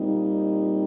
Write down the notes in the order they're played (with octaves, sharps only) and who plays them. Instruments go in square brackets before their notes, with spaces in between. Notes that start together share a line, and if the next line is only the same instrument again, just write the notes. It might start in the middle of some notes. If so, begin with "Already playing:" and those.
Already playing: [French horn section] A#2 G3 C4 D#4